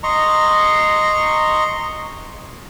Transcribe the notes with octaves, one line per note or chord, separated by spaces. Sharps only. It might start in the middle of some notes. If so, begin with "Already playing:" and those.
D#5 A#5 C6 C#6